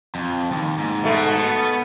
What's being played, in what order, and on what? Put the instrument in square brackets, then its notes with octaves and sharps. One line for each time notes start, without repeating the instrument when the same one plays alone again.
[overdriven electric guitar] F2
D#2
G#2
[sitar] B2 A3
[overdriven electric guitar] B3